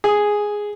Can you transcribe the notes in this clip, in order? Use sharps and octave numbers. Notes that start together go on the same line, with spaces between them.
G#4